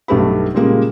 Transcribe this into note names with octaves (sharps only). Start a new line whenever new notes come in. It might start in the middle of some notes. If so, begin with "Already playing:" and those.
B1 G2 A3 G4 B4 B5
A#2 C#3 G3 G#3 A#3